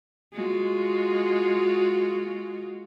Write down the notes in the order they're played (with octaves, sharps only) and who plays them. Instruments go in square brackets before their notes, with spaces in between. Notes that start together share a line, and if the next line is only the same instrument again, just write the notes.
[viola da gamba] G#3 F4 F#4